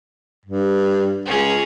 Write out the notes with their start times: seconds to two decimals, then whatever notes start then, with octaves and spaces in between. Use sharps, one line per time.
0.45 G2
1.26 C#2 C#4 G#4